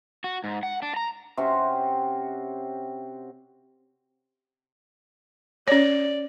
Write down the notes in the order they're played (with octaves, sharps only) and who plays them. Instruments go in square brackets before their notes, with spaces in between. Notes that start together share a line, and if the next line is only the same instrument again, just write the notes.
[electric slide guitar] F#4
G#2
F#5
D4
A#5
[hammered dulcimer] C3 C4 C#4 F#4
[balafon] C#4 C#5 [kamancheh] D5